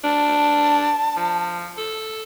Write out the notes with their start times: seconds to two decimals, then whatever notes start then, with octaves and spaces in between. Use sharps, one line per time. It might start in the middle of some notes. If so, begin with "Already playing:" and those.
0.04 D4 A5
1.16 F3
1.78 A4